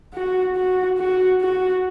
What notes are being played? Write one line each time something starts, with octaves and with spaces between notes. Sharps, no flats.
F#4
F#4
F#4
F#4